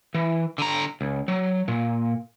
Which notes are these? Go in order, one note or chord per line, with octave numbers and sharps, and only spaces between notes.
E3
D3 A#5
C#2
F#3
A#2